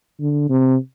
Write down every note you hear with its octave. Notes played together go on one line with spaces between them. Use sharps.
D3
C3